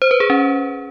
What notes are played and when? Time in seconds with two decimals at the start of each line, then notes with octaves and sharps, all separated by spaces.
0.02 C5
0.11 B4
0.20 G#4
0.30 C#4